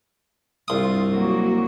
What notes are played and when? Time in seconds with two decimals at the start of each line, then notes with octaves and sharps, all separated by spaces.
0.68 C2 G2 F4 D#6
1.09 F#3 A#3 F#4